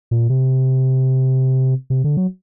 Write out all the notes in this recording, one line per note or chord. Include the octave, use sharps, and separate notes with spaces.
A#2
C3
C3
D3
F#3